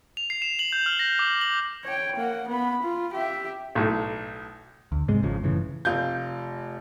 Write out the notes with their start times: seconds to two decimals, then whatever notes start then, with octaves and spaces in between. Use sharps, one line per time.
0.17 F7
0.30 C7
0.42 E7
0.59 F#7
0.72 G6
0.86 F6
0.99 A#6
1.19 D6
1.41 F#7
1.84 C#5 G5
2.16 A#3 F#5
2.48 B3 B5
2.83 F4
3.14 G4 E5
3.75 B1 A2
4.92 D2
5.08 G#2 C3 G#3
5.23 G#1 F2 C#3 F3
5.44 F#2 A2 C#3 E3
5.85 F1 F4 G6